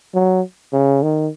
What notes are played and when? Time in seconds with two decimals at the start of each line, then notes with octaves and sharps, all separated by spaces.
0.14 F#3
0.73 C#3
1.02 D#3